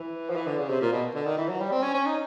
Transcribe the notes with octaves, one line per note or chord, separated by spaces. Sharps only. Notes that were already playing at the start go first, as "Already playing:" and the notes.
Already playing: E3
F3
E3
D3
C#3
C3
A#2
B2
D3
D#3
E3
F#3
G3
C4
C#4
C#4
D#4